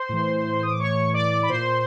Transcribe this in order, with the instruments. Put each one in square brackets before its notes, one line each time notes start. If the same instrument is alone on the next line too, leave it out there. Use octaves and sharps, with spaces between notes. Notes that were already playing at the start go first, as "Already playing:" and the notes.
Already playing: [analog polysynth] C5 C6
A2 E3
D#6
D6
C#5 C#6
D5 D6
B5
A#2 C5 C6